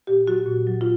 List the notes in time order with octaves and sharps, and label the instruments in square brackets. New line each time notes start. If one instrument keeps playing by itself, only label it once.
[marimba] A#2 G4
F#3 F#4
A#2
F#3
F4